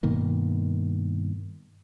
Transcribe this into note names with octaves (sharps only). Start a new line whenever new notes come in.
G2 B2 D#3 A#3